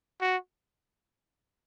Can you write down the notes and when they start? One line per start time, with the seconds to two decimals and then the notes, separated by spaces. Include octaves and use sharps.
0.21 F#4